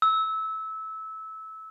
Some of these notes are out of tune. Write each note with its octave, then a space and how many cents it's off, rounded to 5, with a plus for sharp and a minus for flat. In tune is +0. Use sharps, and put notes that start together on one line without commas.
E6 -20